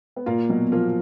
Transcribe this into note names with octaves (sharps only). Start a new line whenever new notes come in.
B3
A#2 A#3 F4
B2 F#3
F3 A#3 F4